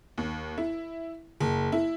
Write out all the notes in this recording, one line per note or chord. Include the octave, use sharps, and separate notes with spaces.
D#2
E4
F#1
E4